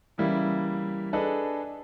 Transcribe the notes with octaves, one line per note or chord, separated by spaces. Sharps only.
C#3 E3 G3 A#3 E4
D4 G#4 A4 B4 D#5